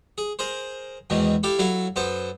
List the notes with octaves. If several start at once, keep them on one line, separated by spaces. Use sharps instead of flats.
G#4
G#4 A#4 C5
E2 G#2 B2 D#3 E3
E4 G4 A4 F5
F#3 E4 A4 F5
F#2 B3 A4 C5